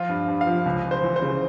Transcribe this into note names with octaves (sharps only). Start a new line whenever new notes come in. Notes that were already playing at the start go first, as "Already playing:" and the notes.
Already playing: F3 F4
G2
G2
F5
F3
C#2
C#2
C5
E3
C5
C#3